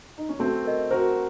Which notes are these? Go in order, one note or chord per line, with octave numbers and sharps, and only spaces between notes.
D#4
C#4
A3 C4 F#4
A#4 D#5
F#4 A#4 C5